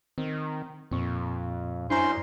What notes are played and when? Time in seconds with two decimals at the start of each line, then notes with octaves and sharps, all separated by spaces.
0.18 D#3 C4
0.91 F2 A#2 C4 C#6
1.90 F#2 C#4 D4 E4 C5 A#5 C6